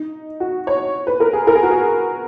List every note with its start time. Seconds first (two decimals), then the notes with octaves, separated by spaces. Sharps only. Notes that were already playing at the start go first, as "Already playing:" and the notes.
Already playing: D#4
0.40 F#4
0.67 C#5
1.07 B4
1.20 A#4
1.33 G#4
1.47 A#4
1.55 G#4
1.63 F#4
1.71 G#4